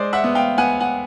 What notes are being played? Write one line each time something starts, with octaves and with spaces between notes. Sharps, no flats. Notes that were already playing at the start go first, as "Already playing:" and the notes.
Already playing: G#3 C5 D5
E5 F#5
B3
F5 G5
B3 F#5 G#5
F#5 G#5